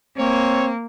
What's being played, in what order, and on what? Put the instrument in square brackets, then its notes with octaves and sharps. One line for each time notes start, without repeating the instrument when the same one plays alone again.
[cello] A#3 [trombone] C4 [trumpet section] C#5